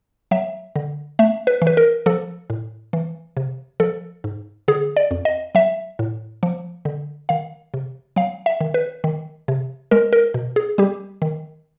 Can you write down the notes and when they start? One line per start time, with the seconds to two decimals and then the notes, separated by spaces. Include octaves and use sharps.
0.31 F#3 E5
0.76 D3
1.19 A3 E5
1.47 B4
1.62 E3
1.67 B4
1.77 A#4
2.06 F3 A4
2.50 A2
2.93 E3
3.37 C3
3.80 F3 A4
4.24 G#2
4.68 D3 G#4
4.97 D5
5.11 F2
5.25 D#5
5.55 F#3 E5
5.99 A2
6.43 F3
6.85 D3
7.29 D#3 F5
7.74 C3
8.16 F#3 F5
8.46 E5
8.61 D#3
8.74 B4
9.04 D#3
9.48 C3
9.91 G#3 A#4
10.13 A#4
10.34 B2
10.56 G#4
10.78 G3 G4
11.22 D#3